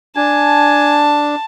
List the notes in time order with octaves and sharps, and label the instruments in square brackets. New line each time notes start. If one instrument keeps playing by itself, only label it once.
[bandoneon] D4 [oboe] G#5 [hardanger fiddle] A5